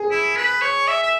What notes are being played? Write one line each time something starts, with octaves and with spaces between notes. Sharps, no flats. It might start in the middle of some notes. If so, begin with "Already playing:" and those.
Already playing: G#4
E4
B4
C#5
E5
E5